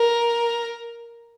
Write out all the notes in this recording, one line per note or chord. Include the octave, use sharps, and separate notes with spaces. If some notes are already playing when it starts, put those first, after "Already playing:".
Already playing: A#4